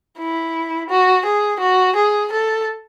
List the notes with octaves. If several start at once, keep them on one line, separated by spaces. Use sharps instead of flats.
E4
F#4
G#4
F#4
G#4
A4